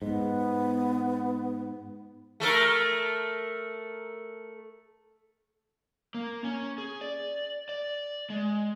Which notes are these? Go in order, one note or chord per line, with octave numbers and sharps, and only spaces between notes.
G#2 B3
A3 A4 A#4
A#3
C#4
G#4
D5
D5
G#3